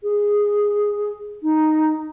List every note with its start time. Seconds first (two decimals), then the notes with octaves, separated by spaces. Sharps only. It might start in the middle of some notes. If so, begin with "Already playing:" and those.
0.03 G#4
1.43 D#4